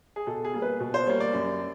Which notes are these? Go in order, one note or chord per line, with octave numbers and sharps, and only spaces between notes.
G#4
B2 A4
G#4
G3 A#3
B4
B2
C5
G3 A#3 C#5
D5
F#2